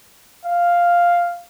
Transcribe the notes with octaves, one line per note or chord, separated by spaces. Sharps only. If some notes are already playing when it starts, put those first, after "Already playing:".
F5